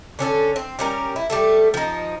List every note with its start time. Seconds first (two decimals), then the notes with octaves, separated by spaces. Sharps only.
0.19 D3 C#4 A4
0.56 C4
0.79 G3 C#4 A#4
1.16 E4
1.30 G3 A3 A4
1.74 F3 D#4